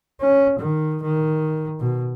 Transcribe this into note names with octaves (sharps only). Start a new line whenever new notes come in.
C#4
D#3
D#3
B2